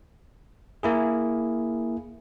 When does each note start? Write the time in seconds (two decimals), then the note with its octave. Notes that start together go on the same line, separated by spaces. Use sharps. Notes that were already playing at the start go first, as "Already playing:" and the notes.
0.83 A#3 E4 G#4